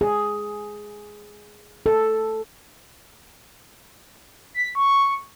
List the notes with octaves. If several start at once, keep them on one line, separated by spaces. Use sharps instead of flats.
G#4
A4
B6
C#6